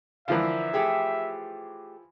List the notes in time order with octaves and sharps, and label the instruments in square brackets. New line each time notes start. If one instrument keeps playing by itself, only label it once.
[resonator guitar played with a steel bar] D3 A#4 [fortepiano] E3 F3 F5 [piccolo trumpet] E5
[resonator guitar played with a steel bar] A3 G4 G#4